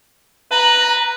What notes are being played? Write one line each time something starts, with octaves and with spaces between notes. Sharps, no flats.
B4 A#5